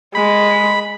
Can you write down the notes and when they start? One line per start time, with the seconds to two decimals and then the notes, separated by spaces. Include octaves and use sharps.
0.15 G#3 B5